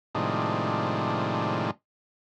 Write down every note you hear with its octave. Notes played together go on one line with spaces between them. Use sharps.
A2 C3 D#3 F3 G#3 D4